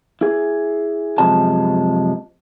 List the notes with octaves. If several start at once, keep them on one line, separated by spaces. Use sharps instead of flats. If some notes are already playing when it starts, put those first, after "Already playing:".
E4 G#4
F#2 C3 F3 G#3 A5